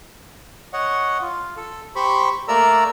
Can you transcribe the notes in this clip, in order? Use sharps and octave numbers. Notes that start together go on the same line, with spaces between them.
C#5 D#5 F#5
F4
A4
G4 C5 B5 C#6
A3 A#3 A#4 D5 A#5 E6